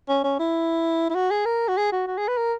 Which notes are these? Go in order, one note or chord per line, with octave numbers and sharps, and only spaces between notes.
C#4
C#4
E4
E4
F#4
G#4
A#4
F#4
G#4
F#4
F#4
G#4
B4
A#4